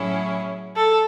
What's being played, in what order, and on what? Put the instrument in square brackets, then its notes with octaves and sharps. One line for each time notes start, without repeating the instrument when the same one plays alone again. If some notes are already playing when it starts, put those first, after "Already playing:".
Already playing: [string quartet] A2 F#3 C#4 E4 G#4
[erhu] A4